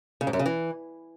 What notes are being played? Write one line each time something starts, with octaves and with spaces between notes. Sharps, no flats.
C#3
G#2
F#2
C#3
E3